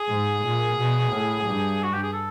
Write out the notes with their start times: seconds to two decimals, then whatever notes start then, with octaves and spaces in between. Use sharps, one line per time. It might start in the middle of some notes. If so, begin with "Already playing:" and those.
Already playing: G#4
0.08 G#2
0.43 A#2
0.76 B2
1.10 A2
1.45 G2
1.83 F#4
1.93 G4
2.03 G#4
2.13 A4